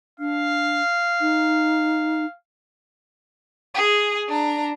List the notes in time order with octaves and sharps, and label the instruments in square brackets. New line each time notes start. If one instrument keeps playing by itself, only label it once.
[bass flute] D4 [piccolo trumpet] F5
[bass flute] D#4
[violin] G#4
D4 A#5